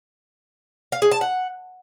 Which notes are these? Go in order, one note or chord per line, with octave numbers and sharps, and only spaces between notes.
F5
G#4
A5
F#5